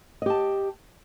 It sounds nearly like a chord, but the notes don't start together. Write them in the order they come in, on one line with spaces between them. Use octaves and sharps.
D#5 G4 A5